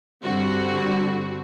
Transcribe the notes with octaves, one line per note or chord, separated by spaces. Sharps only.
G2 D3 G3 C4 F#4